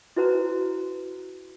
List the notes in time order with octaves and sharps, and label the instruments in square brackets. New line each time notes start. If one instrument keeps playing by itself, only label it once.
[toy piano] E4 F#4 B4 C5 A#5